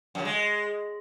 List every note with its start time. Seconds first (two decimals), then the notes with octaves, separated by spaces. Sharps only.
0.15 F#2
0.20 C#3
0.25 G#3